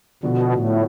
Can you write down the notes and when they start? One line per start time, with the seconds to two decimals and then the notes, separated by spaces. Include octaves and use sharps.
0.23 B2 D3 F3 B3 F#4
0.53 A2